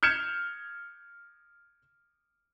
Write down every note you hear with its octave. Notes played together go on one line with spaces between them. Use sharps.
F6 G6 G#6 C#7 E7